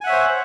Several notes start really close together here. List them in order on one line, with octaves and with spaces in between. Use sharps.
G#5 F#5 E5 C#5 C5